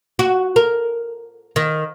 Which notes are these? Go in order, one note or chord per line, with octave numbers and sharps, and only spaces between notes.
F#4
A#4
D#3